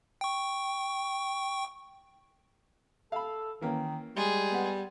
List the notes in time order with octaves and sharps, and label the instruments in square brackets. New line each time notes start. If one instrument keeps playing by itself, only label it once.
[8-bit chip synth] G5 C#6
[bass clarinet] A4 [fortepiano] F5 B5
[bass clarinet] D#3 [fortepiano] E3 A#3 C#4
[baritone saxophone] G3 [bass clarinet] G#3 [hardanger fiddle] G#4
[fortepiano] B3 F#5